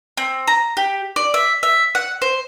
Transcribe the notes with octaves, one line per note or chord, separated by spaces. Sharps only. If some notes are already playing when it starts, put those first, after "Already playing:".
C4
A#5
G4
D5
E5
E5
F#5
C5